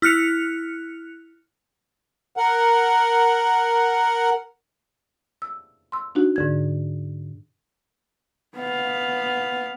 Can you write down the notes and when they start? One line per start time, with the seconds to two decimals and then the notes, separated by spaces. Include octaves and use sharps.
0.02 E4 F6 F#6 C#7 F7
2.37 A#4 F#5
5.42 E6
5.92 C6 E6
6.15 D4 D#4 F#4
6.36 G#2 D3 G#6
8.56 B3 F5